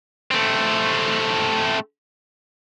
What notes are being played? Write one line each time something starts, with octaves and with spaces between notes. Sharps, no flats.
A3 C4